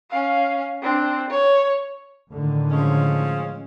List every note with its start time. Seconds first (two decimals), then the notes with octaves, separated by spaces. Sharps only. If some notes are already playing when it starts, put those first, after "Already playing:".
0.10 C#4 F5
0.82 C4 D4
1.30 C#5
2.32 A2 D3 D#3
2.71 F3 G#3 C#4